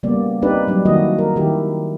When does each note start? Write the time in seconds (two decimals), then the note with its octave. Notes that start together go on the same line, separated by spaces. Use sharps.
0.03 C#3 G3 A#3 B3 D5
0.42 C4 D4 D#4 G4 B4 D5
0.67 F#3 G3 D4
0.85 D#3 A#3 E4 F#4 D#5
1.19 A#4
1.36 D#3 E4 G4